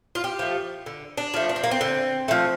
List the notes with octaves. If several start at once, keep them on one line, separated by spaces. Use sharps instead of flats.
F4
G4
F3 A3
D3
D4
F3 A3
D4
C4
A#3
C4
D3
F3 A3